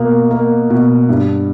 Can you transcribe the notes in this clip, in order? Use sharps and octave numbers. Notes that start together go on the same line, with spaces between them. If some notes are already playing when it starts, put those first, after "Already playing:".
Already playing: B2 A#3
A#3
B2
G2